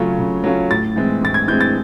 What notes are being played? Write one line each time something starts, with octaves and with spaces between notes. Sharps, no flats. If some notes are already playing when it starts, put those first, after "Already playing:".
Already playing: C#3 F#3 A3 C#4 F4
C#3
F#3 A3 C#4 F4
A2 A6
E3 G#3 C4
A2 A6
G#6
E3 G#3 C4 G6
A6